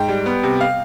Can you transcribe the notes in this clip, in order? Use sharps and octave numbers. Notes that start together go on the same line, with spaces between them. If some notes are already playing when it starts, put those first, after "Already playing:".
Already playing: G#2 G5
G3
B3
C3
F5